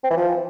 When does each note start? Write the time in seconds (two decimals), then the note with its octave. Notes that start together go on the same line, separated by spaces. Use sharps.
0.04 C4
0.11 E3
0.17 F3